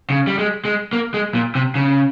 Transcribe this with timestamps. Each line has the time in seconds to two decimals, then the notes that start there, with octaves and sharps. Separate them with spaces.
0.10 C#3
0.27 G3
0.38 G#3
0.65 G#3
0.93 A#3
1.14 G#3
1.35 A#2
1.55 C3
1.75 C#3